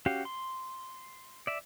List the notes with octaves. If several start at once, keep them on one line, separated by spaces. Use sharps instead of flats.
C#4 F#4 G4 F5
C6
D5 E5